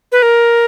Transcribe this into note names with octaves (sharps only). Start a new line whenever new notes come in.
B4
A#4